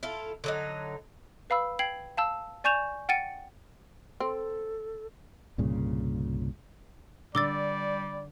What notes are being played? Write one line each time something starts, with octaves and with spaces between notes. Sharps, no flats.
E4 F4 A4
D3 F#3 D#4
B4 F5 B5 E6
G5 G#6 C7 F#7
F5 A5 E6
D5 G#5 C#6 G6 E7 F7
F#5 G5 A6 C#7 D#7
C4 A4
C2 G2 A#2 C#3
D3 G3 D5 D6 E6 A6